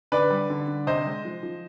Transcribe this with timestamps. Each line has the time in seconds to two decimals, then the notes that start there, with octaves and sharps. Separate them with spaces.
0.12 D3 B4 D5
0.30 G3
0.50 D3
0.68 D3
0.87 C3 C5 D#5
1.05 G#3
1.25 F3
1.43 F3